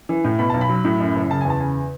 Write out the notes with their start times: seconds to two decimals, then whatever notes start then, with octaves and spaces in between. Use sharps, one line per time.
0.09 E3
0.24 A2
0.39 B2 B5
0.50 B1 A5
0.61 B5
0.69 F#3
0.85 A2
1.00 F#2
1.15 F#1
1.30 C#3 A5
1.41 G#5
1.45 E2 A5
1.60 C#3 G#5